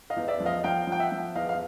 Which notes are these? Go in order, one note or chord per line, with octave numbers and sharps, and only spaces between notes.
D#5 F5
E2
D5 E5
F3
D#5 F5
F3 F5 G5
F3 G5
E5 F#5
F3
E2 D#5 F5
F5